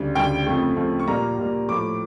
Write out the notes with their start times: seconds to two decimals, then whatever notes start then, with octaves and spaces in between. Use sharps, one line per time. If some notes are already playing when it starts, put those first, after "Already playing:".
Already playing: D2 C#3 G3
0.15 D2 C#3 G3 G5
0.46 F2 C#3 F3 A3
0.77 F2 C#3 F3 A3
0.99 C#6
1.07 A#2 G3 A#3 A#5
1.38 A#2 G3 A#3
1.68 A2 F3 A3 D6